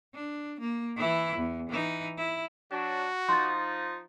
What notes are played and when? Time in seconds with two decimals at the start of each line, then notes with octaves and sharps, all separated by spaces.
0.15 D4
0.61 A#3
0.97 E3 E4
1.36 E2
1.70 E3 D#4
2.17 E4
2.71 F#3 D4 F#4
3.29 F3 D#4 C6 A6